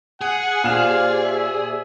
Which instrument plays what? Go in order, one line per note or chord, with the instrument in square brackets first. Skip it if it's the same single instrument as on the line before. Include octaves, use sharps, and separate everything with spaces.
[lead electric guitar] G#4 [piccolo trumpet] F#5
[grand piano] A#2 E7 [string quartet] G4 C5 D5 [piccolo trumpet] F5
[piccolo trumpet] E5